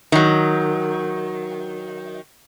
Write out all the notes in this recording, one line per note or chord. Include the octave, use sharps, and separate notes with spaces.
D#3 F#3